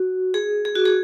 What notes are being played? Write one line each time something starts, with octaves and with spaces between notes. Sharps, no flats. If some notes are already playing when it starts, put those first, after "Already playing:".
Already playing: F#4
G#4
G#4
F#4
G#4